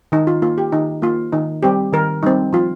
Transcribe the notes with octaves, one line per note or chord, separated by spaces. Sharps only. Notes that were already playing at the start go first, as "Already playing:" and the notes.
D#3 D#4
F4
A#3 F4
G4
D#3 D#4
A#3 F4
D#3 D#4
G3 C4 G4
D#3 A#4
G3 C4 D#4
F3 F4